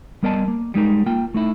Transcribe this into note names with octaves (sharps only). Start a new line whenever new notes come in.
G3 B3 A#4 D5 D#5 A5
A#3
G3 G#3 D#4 A#4
A#3 F4 G5
A3 D#4 E4